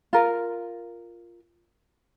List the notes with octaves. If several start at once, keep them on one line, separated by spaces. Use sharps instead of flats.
F4 A#4